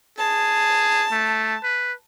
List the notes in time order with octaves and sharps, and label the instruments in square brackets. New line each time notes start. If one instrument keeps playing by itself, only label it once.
[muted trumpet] G#4 [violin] A5
[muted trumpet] A3
B4